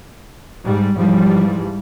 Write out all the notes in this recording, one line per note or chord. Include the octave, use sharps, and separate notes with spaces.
G#2 G3
G#2 E3 F3 G3